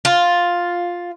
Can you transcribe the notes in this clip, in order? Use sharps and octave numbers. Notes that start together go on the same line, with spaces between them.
F4